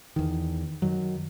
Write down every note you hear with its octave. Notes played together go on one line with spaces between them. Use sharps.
E2 D#3
F#2 D#3 F#3